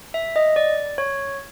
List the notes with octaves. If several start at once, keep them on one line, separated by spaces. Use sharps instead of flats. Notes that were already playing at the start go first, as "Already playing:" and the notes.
E5
D#5
D5
C#5